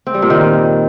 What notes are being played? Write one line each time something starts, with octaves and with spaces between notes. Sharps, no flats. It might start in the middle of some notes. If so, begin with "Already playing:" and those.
C4
G3
A#2
D#3